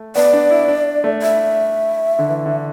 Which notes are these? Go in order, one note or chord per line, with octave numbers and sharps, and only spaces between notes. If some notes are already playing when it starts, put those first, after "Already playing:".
Already playing: A3
B3 D5
D4
E4
D4
A3
E5
D3
E3
D3